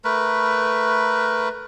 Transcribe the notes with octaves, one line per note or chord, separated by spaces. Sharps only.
A3 A#4 B4